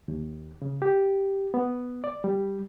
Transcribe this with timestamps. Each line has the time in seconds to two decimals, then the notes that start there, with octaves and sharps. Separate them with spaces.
0.08 D#2
0.62 C#3
0.82 G4
1.54 B3
2.04 D5
2.24 G3